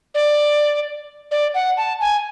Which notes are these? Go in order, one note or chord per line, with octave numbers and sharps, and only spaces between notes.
D5
D5
F#5
A5
G#5